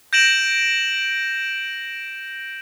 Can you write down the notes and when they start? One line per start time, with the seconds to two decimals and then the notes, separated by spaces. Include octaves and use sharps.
0.13 G6 A#6 D7 E7 F#7